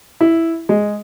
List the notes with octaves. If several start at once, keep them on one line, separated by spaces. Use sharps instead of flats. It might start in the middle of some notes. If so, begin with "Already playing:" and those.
E4
G#3